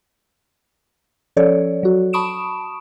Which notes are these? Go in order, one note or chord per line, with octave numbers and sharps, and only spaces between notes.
F3 C#4 A4 C#5 D5
F#3 F#4
A5 B5 C#6 D#6 D7 E7